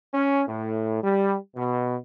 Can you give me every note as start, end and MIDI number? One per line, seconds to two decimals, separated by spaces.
0.14 0.44 61
0.48 1.02 45
1.03 1.36 55
1.56 1.96 47